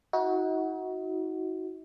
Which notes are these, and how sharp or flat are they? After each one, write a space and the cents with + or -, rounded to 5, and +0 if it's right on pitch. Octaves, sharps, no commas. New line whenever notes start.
D#4 +45 F#4 +0